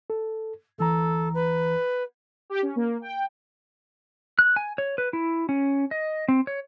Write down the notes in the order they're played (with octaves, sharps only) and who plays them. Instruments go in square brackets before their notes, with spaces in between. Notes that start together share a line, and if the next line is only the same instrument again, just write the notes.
[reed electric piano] A4
[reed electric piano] D2 E3 A#5 [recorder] A4
[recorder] B4
[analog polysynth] G4
C#4
A#3
G5
[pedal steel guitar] F#6
G#5
C#5
B4
E4
C#4
D#5
C4
C#5